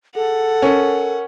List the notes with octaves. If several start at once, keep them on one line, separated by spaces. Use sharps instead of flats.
G#4 A4 F#5
C#4 A#4